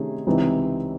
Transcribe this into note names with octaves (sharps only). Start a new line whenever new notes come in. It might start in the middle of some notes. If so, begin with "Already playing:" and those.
Already playing: C3 D#3 A3 C#4 G#4
C#2 C3 E3 C4 D#4